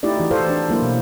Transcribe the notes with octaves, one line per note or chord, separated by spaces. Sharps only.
A3 D#4 E4 G4 D5
E3 F#4
E4 A4 C5 D5 F5
D4
F#3 A#3 E4 C5
B2